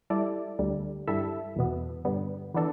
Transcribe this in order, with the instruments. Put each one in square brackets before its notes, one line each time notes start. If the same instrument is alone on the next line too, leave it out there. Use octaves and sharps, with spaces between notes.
[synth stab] G3 E4 A4 D5
D2 D3 G3
G2 G3 E4 A4 E5
E2 B2 B3
G2 D3 G3 B3
E3 B3 D4 A4